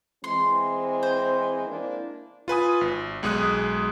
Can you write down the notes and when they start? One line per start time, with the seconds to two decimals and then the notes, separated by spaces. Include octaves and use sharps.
0.24 E3 G#3 C4 C6
1.03 C5
1.68 A#3 D4 E4
2.48 F4 B4 G#5 D#6
2.81 G#1
3.23 B1 G#3 G#4 D#6 F#6